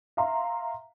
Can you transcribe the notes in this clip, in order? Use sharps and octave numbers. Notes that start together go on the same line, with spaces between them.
E5 F5 A#5 C6